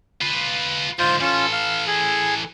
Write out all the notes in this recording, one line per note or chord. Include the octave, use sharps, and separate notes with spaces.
F4 B4
G#2 D3 F4 C5
E3 C#4 F4 A4
F5
G#4